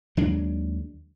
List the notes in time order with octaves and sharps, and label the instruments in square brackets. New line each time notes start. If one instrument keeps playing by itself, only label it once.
[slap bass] D#2 F#3 G#3 D4